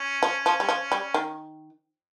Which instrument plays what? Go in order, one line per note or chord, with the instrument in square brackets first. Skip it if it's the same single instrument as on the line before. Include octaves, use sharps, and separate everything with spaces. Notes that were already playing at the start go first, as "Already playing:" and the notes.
Already playing: [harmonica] C#4
[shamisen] F3
F3
G3
F3
G3
D#3